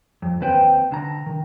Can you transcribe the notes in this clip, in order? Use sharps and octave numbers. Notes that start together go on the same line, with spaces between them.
F2
D#2 C4 B4 C5 G5
D3 A#5
D#3